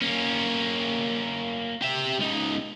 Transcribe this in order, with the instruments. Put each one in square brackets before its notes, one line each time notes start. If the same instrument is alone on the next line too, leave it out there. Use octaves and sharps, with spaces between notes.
[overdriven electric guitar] A#3 C#4
G4 E5
C#2 D#4